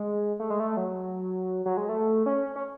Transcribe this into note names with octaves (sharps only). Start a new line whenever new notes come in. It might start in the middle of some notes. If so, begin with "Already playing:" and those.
Already playing: G#3
A3
G#3
A3
F#3
F#3
G#3
A3
C#4
C#4